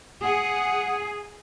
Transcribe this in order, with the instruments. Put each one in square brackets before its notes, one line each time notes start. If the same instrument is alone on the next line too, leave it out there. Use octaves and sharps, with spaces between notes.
[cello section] G#4 [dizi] F#5